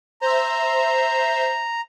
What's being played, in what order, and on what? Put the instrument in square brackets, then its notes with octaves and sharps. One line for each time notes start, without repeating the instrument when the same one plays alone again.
[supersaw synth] C5 E5 [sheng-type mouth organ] A#5